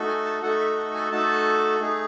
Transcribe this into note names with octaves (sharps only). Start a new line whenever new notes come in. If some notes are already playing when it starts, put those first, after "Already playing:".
Already playing: A3 D#4 F#4 A4
G#5
A5
A3 D#4 F#4 A4 F#5
E5
F#5
G#5
A3 D#4 F#4 A4 A5
A3 D#4 G#4